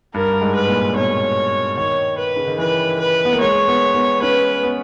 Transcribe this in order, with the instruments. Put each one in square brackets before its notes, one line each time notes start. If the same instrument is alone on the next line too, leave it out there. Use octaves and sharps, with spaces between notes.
[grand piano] G2 [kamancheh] A#4
[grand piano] G2
G#2
[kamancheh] B4
[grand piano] A#2
[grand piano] B2 [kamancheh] C#5
[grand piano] D#3 [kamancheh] C#5
[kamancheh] B4
[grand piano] C#3
D#3
[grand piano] E3 [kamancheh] B4
[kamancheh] B4
[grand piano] B3
A#3
[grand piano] G#3 [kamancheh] C#5
[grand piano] B3
B3
[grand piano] C#4 [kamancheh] B4
[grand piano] B3